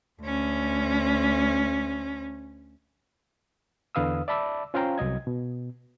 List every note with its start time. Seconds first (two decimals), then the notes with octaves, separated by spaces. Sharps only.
0.21 D2 C#4
3.95 E2 D3 B4 F5 D#6 E6
4.28 D5 E5 A5 B5 D6 E6
4.74 C#4 F4 C5 F5 G5 A#5
4.98 C2 F#3 D#5 G#6
5.27 B2